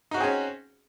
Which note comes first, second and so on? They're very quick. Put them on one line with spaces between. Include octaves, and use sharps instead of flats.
D#4 F#4 C4 G#4 C#4